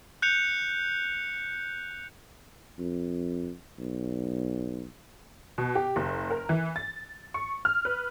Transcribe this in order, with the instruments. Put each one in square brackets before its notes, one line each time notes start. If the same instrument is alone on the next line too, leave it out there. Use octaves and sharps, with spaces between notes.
[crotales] F#6 G6 C#7 F7
[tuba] F2
B1
[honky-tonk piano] B2
G4
F#1
A#4
E3
A6
C#6
F6
B4